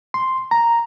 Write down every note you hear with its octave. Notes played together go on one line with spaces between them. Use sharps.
C6
A#5